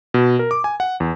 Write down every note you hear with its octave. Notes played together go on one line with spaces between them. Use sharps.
B2
A#4
D6
G#5
F#5
E2